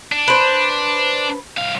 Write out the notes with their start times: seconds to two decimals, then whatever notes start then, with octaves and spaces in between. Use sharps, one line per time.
0.12 D4
0.28 B4 C5
1.57 C2 F5